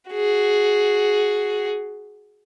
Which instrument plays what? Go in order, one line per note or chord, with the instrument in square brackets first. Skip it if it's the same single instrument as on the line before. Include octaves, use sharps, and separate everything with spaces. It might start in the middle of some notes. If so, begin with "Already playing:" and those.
[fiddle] F#4 G#4